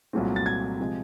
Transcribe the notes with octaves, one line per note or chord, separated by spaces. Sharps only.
C2 A#2 F#3 A3 C4
A6
G#6
C3 F3 G#3